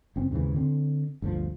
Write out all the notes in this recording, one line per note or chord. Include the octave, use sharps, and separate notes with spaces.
F#1 C4 C#4
D#2 G#2 C#3 E3
D3 C4
G1 D2 C3 F3